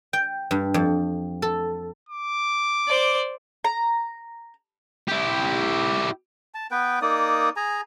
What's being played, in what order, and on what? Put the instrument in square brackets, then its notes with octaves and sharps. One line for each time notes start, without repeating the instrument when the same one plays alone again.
[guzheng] G5
G2
F2
A4
[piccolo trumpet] D6
[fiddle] C5 D5
[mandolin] A#5
[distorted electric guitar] E4 G4
[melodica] A5
B3 B4 G5
A#3 D#4 D5 D#6
G#4 G#5 A#5